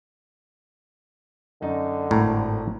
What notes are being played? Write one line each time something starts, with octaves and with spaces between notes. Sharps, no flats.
F#2 D3 D#4
G#1 A2 A#5